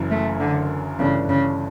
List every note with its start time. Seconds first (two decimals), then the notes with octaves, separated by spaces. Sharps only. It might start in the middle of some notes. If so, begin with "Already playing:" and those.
Already playing: F#1 F#2 E3
0.11 A3
0.40 D3
0.99 G1 G2 C#3 E3 A3 D4
1.29 C#3